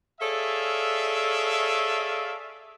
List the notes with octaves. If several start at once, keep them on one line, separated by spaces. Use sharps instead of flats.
G#4 A4 C#5 D5 E5 F5